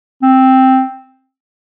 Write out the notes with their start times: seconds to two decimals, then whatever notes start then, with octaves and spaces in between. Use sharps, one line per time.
0.23 C4